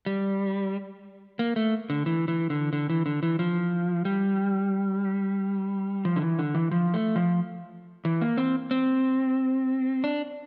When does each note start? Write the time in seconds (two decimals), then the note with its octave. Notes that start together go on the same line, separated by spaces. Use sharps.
0.06 G3
1.39 A#3
1.56 A3
1.90 D3
2.06 E3
2.28 E3
2.50 D3
2.73 D3
2.90 E3
3.06 D3
3.23 E3
3.39 F3
4.05 G3
6.05 F3
6.16 D3
6.22 E3
6.39 D3
6.55 E3
6.71 F3
6.94 A3
7.16 F3
8.05 E3
8.21 A#3
8.37 C4
8.71 C4
10.04 D4